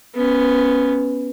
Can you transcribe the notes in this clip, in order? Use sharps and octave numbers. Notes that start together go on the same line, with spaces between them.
B3 C#4